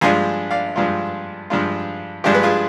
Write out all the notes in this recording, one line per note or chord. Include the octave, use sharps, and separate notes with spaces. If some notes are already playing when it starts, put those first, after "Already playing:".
G2 F3 G#3 D4 F4 F5 G#5
D5 F5
G2 F3 G#3 D4 F4
G2 F3 G#3 D4 F4
G2 F3 G#3 D4 F4 G4
B4
F4 G#4